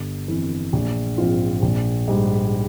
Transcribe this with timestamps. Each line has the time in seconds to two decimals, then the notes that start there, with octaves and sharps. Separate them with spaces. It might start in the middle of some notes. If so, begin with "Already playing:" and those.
Already playing: G1
0.28 F2 E3
0.73 A#1
1.18 G#2 F3 C4 F4
1.62 A#1
2.08 G#2 G3